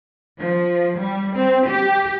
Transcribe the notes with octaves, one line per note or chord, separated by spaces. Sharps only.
F3
G3
C4
G4